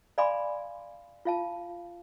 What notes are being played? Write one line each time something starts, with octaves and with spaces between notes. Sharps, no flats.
D5 F5 G#5 B5 C6 D6
F4 F5 A5